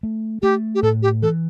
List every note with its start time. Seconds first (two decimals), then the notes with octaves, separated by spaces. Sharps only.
0.03 A3
0.42 A3 G4
0.75 G4
0.83 A2 A4
1.02 G4
1.22 E3 A4